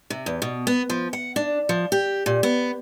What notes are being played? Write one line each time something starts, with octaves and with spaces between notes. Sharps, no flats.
C3
E2
B2
B3
F3
F#5
D4
F3
G4
A#2
B3